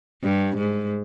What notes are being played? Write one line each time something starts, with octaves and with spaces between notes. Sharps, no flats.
G2
G#2